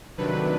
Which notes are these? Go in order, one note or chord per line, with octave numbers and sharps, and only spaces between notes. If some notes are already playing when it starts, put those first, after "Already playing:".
C3 D#3 F#3 A3 D4 B4